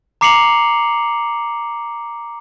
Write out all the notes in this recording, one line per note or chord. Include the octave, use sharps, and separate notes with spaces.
A#5 D6 C7 C#7 F7 F#7